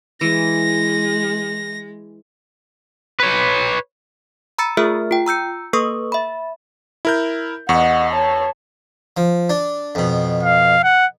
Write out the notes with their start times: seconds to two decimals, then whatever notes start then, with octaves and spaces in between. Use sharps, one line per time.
0.21 E3 G#3 A#6
3.20 B4 C#5
4.58 A#5 B5 E6 A6 C#7
4.77 A3 F4 G#4 A#4 E5 F6
5.11 F4 G5
5.26 A#5 E6 G6 C#7
5.73 A#3 A4 B4 C#6 D#6
6.12 E5 B5
7.05 E4 A#4 G6
7.69 E2 D#5 F#5 C#6
8.13 C#5 A5
9.17 F3
9.50 D4
9.95 F2 B2
10.43 F5
10.83 F#5